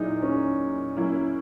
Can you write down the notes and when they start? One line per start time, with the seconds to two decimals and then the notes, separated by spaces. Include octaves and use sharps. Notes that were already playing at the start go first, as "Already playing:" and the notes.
Already playing: A#2 F#3 D#4 E4 G#4
0.22 C#4
0.96 F#3 A#3 C#4 E4